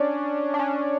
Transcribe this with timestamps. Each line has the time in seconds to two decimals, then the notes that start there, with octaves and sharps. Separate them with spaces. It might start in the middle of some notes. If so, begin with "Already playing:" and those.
Already playing: C#4 D4
0.54 D4
0.59 C#4